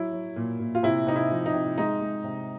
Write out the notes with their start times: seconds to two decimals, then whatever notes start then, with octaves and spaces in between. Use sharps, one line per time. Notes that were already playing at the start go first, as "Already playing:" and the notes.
Already playing: F#3 E4
0.13 F#3
0.36 A#2
0.60 A#2
0.75 F4
0.83 C3 E4
1.07 C3 D#4
1.16 E4
1.31 F3
1.46 D#4
1.54 C3
1.78 G#3 D#4
2.01 G#3
2.24 C3